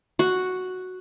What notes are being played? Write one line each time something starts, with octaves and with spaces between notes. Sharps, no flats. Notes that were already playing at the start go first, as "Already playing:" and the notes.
F#4